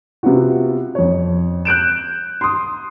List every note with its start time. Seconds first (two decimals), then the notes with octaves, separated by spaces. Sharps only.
0.23 C3 B3 F4 F#4
0.95 F2 C#5
1.65 F#6 G6 D7 E7
2.41 C6 D#6